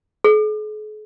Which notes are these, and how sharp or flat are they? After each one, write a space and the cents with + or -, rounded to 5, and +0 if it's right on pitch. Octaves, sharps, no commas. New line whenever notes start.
G#4 +45